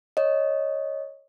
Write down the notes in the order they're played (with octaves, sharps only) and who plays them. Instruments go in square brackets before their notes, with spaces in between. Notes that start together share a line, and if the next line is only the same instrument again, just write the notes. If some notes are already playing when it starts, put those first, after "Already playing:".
[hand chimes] C#5 D#5